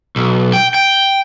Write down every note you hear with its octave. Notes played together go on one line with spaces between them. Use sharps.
B1
G5
G5